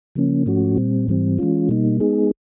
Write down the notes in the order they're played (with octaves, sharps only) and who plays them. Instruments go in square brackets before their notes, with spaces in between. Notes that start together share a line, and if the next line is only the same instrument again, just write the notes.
[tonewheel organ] C#3 F3 A#3 C#4
G#2 F3 A3 C#4 F#4
A#2 G3 C4
G#2 E3 G3 C4
E3 G#3 C#4 F4
B2 G3 A#3 D#4
G#3 B3 D#4 G#4